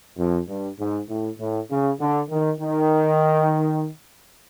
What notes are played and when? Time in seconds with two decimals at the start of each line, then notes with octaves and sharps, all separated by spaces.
0.18 F2
0.48 G2
0.79 G#2
1.10 A2
1.40 A2
1.70 C#3
2.00 D3
2.31 D#3
2.61 D#3